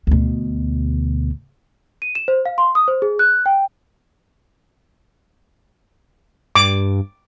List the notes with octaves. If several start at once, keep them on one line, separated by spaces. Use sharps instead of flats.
D2 B2
D#7
E7
C5
F5
C6
D#6
C5
G#4
F#6
G5
G2 D6